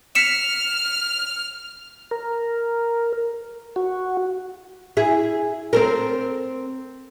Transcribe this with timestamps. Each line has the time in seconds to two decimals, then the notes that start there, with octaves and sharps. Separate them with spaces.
0.15 F6 B6 C#7 E7
2.11 A#4
3.76 F#4
4.97 E4 G#4
5.73 C4 A4 A#4